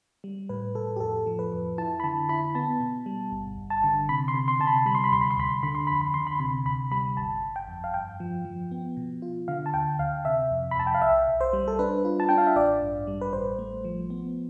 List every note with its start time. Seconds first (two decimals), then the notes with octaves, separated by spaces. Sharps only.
0.24 G3
0.49 A2 B4
0.75 A2 A4
0.96 G4
1.00 F2 A4
1.27 F3
1.39 B4
1.52 F2
1.78 E4 A5
2.00 B5
2.04 D3 A5
2.29 E4 B5
2.55 B3 A5
2.80 B2
3.06 G3
3.32 G1
3.57 G1
3.70 A5
3.84 D3
4.09 C3 B5
4.28 C6
4.34 C3
4.48 C6
4.60 C3 A5
4.67 B5
4.86 G3 B5
4.95 C6
5.04 B5
5.12 D2 C6
5.21 B5
5.31 C6
5.37 D2 B5
5.63 D3 B5
5.75 C6
5.87 F2 B5
6.01 B5
6.14 D3 C6
6.27 B5
6.40 C3 B5
6.65 D2 B5
6.91 G3 B5
7.17 G1 A5
7.42 G1
7.56 G5
7.68 F2
7.84 F5
7.94 G2 G5
8.20 F3
8.45 F3
8.71 B3
8.97 B2
9.22 F4
9.48 D3 F5
9.66 A5
9.74 D2 G5
9.99 D2 F5
10.25 C3 E5
10.51 F2
10.71 B5
10.76 F2 A5
10.87 G5
10.95 F5
11.02 B1 E5
11.28 B1
11.41 C5
11.53 G3
11.68 A4
11.79 D4 B4
12.05 F4
12.20 A5
12.29 D4 G5
12.38 F5
12.47 E5
12.56 A1 D5
12.82 G2
13.07 G3
13.21 B4
13.33 A1 C5
13.59 A3
13.85 F3
14.10 B3